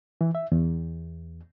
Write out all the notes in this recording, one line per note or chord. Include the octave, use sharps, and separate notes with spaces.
E3
E5
E2